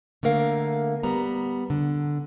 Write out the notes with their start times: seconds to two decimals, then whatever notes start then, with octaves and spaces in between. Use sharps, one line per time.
0.23 D3 A3 A#3 A#4 F5
1.03 G3 B3 A#5
1.70 D3